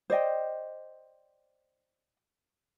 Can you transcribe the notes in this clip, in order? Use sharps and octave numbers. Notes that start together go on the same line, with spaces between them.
C5 D5 D#5 G5